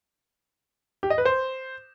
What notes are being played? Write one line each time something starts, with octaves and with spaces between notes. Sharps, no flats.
G4
D#5
B4
C5